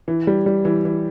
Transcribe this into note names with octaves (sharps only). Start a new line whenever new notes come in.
E3
G3
G3
E3
E3